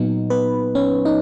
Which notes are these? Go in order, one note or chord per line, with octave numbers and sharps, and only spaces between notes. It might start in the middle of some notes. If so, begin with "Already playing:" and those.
Already playing: A#2 F#3 B3 D#4
B3 B4
C#4 C#5
D#4 D#5